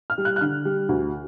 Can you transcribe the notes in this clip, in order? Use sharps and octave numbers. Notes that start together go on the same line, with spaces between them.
F6
G3
F#6
F#6
D3 F6
G3
D2